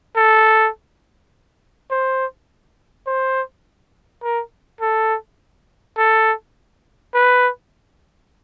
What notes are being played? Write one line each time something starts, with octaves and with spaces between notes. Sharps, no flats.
A4
C5
C5
A#4
A4
A4
B4